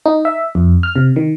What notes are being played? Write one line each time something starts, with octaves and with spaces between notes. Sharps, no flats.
D#4
E5
F2
F6
C3
D#3